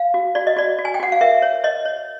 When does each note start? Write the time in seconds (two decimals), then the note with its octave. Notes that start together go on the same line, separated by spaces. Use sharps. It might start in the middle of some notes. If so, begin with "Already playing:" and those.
Already playing: F5
0.14 F#4
0.35 F#4 D5
0.47 D#5
0.57 F#4 D5
0.79 F#4
0.85 G#5
0.94 G5
1.00 F#4 F#5
1.12 F5
1.21 A#4 E5
1.42 C#5
1.64 C#5 D#5
1.85 C#5